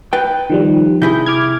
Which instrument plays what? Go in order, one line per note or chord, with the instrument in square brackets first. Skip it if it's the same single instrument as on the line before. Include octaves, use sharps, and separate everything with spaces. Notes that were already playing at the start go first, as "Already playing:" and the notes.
[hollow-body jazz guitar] B4 G5
[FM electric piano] D#3 F3 G3
[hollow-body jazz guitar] C3 E4 G#4 [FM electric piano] G6
[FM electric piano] D6 F6 G#6